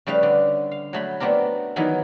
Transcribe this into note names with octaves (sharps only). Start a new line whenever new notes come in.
C#3 G3 A3 B4 F5
D3
F5
F#3 A3 B5
A3 B3 C4 D4 A#4
D#3 E3 F#3 B3 D#4